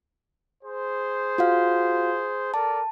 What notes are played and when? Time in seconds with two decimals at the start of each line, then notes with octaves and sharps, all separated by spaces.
0.64 G#4 C5
1.38 F4 F#4 F5
2.54 A4 A#4 D5 A5